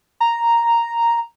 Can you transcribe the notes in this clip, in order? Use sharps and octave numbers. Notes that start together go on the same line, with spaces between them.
A#5